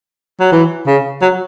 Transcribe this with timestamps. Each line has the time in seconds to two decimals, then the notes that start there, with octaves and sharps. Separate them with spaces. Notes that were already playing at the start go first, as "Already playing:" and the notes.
0.40 F#3
0.52 E3
0.87 C#3
1.22 F#3